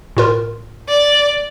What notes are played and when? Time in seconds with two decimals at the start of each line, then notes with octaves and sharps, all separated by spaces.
0.17 A2 F4 A#4
0.89 D5